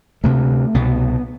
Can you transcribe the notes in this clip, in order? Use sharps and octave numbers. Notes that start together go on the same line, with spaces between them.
D2 C3 A3
C2 B2 B3